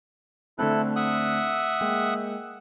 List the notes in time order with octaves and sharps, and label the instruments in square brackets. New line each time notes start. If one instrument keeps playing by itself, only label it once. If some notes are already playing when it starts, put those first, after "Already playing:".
[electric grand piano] D3 A3 C4 [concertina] E4 A4 F#6
[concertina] E5 F#5 D#6
[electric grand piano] G#3 A#3 G5